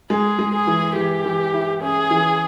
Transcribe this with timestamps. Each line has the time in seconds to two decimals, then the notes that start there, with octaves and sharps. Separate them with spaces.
0.10 G#3 G#4
0.39 G#3
0.53 G#4
0.67 E3
0.95 E3 G4
1.25 E3
1.54 E4
1.82 C#4 G#4
2.11 E3